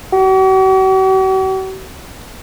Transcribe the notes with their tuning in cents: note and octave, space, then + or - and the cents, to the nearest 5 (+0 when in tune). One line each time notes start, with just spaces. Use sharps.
F#4 +45